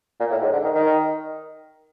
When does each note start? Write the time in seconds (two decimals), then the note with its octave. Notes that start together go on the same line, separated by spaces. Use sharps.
0.20 A#2
0.31 A2
0.42 G#2
0.53 D3
0.64 D#3
0.75 D#3